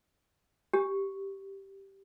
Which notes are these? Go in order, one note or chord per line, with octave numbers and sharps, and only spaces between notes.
G4